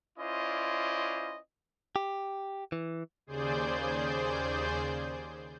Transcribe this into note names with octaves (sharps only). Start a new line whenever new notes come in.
C#4 E4 F4 C5 D5 D#5
G4
E3
D#2 C#3 G#4 C5 D5 G6